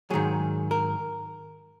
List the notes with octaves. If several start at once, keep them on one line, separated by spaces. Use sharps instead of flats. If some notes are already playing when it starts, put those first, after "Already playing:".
G#2 D#3 F#3 G#4
A#4